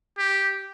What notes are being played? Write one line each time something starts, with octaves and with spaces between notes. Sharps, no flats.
G4